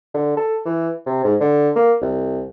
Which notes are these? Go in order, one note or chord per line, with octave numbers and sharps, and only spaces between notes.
D3
A4
E3
C3
G#2
D3
A#3
C2